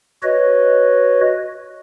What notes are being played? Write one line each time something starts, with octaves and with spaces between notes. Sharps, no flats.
F#4 B4 C#5 D#5